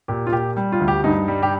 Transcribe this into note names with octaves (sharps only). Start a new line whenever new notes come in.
A#2 G4
F4
A#2 G4
G3
F4
D2
G4
G2 D#4
G3
G4